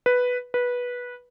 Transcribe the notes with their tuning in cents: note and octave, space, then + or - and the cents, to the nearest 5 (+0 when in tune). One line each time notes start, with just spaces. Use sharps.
B4 +0
B4 -15